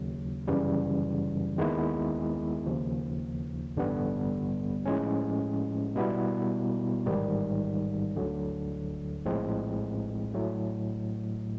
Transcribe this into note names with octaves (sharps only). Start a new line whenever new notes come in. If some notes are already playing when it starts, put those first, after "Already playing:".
Already playing: D#2 C#3 F#3
G1 F#2 C#3 E3 G3
D#2 D#3 G#3 B3 E4
D#2 C#3 F3
A1 G2 D3 G3 B3
A2 F3 G#3 C#4
B2 G3 B3 E4
A1 G#2 D#3 G3
D2 D3 F#3
A#1 A2 F3 G#3 C4
A2 F#3 A3